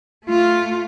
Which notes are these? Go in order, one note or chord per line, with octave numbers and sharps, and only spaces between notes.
A3 F4